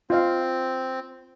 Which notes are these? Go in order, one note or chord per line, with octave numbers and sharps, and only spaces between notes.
C4 F4 D#5 F5